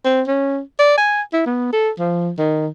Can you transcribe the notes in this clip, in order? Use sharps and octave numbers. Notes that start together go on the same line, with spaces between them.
C4
C#4
D5
G#5
E4
B3
A4
F3
D#3